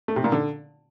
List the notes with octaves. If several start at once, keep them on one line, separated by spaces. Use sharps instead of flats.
A3
C3
A#2
D3